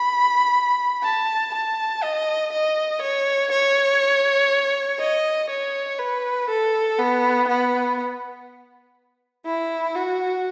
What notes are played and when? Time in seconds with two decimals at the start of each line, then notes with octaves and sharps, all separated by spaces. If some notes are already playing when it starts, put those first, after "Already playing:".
Already playing: B5
1.03 A5
1.54 A5
2.03 D#5
2.52 D#5
3.01 C#5
3.51 C#5
4.99 D#5
5.50 C#5
5.99 B4
6.49 A4
6.99 B3
7.48 B3
9.46 E4
9.96 F#4